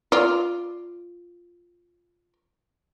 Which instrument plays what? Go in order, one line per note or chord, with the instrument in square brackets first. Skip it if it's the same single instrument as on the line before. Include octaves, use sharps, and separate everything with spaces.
[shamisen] F4 D5